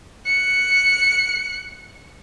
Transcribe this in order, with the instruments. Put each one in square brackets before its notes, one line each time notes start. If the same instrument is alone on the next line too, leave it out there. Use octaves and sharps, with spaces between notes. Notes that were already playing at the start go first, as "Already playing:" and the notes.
[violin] F#6 C#7